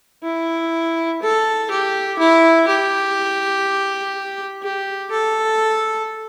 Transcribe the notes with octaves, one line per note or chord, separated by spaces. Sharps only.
E4
A4
G4
E4
G4
G4
A4